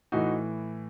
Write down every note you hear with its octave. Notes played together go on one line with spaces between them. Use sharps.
A2 E3 D#4 F#4